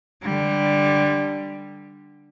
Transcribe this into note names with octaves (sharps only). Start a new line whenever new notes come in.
D3 G3